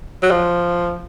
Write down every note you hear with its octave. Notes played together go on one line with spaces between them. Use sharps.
F#3
F3